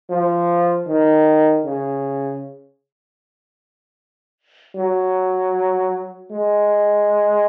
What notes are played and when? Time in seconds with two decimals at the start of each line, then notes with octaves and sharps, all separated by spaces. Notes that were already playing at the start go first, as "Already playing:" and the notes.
0.10 F3
0.87 D#3
1.65 C#3
4.76 F#3
6.31 G#3